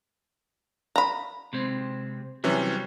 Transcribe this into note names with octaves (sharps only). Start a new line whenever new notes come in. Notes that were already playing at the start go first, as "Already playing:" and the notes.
A#5 B5
C3 G#3 C4
C3 E3 F#3 G3 C#4